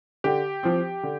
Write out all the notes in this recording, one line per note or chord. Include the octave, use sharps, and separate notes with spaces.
D3 G4
F3 C4
D3